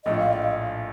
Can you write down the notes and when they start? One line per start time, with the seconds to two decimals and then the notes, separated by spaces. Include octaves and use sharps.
0.05 A#1 A2 A3 D4 F4 D#5
0.20 F5
0.33 D#5
0.42 F5